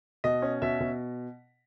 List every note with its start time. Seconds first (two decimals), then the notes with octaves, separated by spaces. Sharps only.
0.24 B2 D#5
0.42 C#4
0.62 B2 E5
0.80 B2